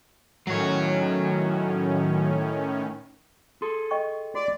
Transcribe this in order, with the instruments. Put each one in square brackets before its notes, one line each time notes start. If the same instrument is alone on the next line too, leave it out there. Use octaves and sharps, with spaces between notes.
[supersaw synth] A2 D#3 C#4 [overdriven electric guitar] F#3 C#5
[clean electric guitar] G#4 A4 [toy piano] C6
[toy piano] D#5 G5 C#6
[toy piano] F#4 G#4 [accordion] D5